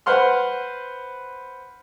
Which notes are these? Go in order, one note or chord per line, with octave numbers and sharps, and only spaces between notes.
B4 C5 F#5 C6 F6